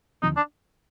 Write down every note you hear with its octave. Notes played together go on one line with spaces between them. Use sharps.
D#2 D3 F3 C4 D#4
D4